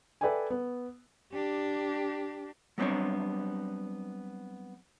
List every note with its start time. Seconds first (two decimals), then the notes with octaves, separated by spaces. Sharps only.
0.21 A4 B4 D5 E5 G5 G#5
0.50 B3
1.33 D4 G4
2.78 F#3 G3 B3 C4 D4 C#5